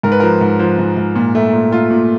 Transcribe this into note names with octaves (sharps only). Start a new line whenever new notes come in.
G#2 A#4
B4
F3 A#4
G#2
F3
G#2
G#2
A#2
A3
A#2
A3 F4
A#2